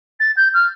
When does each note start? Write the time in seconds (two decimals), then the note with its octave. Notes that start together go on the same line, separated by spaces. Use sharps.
0.19 A6
0.36 G6
0.53 F6